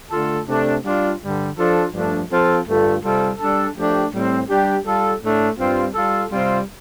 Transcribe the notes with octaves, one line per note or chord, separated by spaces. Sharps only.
D3 A3 F4 A4
C3 A3 D4
G3 D4 F4
G2 D3 G3
F3 D4 F4 A4
G2 F3 A3 D4
F3 C4 F4 A4
G2 D3 A3 F4 A4
C3 G3 C4 F4 A4
G3 D4 A4
F3 A3 D4 G4
A2 G3 C4
G3 D4 G4
G3 F4 A4
A2 A3 D4
G2 G3 C4 F4
G3 F4 A4
C3 G3 C4 F4